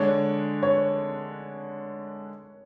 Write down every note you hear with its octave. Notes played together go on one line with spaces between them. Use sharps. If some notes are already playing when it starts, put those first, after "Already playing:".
Already playing: D3 G#3 D4 C#5
C#5